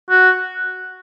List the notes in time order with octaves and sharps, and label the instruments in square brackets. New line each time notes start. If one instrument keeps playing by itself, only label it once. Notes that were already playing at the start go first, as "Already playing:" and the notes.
[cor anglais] F#4